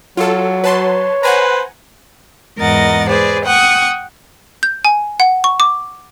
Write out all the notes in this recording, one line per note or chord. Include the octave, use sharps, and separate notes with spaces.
F#3 F4 A4
B4 C#5 A5 C6
B4 C5 F#5 G#5 A#5
E2 G#2 A#4 D#5 F#5 A6
G#4 B4 C5 D5
F#5 G5 C#6 D#6
G6
G#5
F#5
C#6
D6